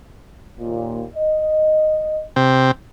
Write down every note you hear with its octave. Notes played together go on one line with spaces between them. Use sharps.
D#2 A#2
D#5
C3 C4